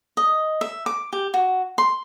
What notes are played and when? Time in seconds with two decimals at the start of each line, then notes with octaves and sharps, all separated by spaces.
0.17 D#5
0.61 E5
0.86 D6
1.13 G4
1.34 F#4
1.78 C6